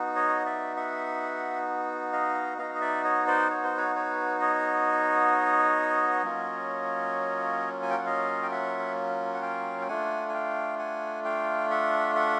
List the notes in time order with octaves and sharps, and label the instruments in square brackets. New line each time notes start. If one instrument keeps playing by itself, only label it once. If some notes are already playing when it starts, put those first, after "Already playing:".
Already playing: [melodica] B3 D#4 F#4
C#5 D#5
D5 E5
E5 F#5
D#5 F5
B3 D#4 F#4 D#5 F5
D#5
D5 E5
C#5 D#5
C5 D5
C#5
C5
B4 C#5
B4 C#5
C#5 D#5
F#3 A#3 C#4 F4
G#5
G5
F#5
D#5 F5
G5
E5 F#5
F#5
F5 G5
G5
A3 D4 F4 F#5 G#5
G#5
F5 G5
F#5 G#5
F5 G5
E5 F#5
E5 F#5